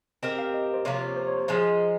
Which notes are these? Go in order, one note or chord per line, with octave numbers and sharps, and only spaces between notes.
C4 G4 A#4 D#5
F5
D#5
C5
C3 F3 A#3 F4 C#5
C#5
C5
C#5
C5
F3 G#3 D#4